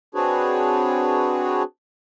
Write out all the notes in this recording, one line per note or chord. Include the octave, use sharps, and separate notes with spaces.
C4 D4 F#4 G#4 B4 C#5